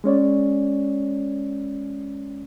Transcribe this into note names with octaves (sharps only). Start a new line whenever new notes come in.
G#3 C#4 C#5 D5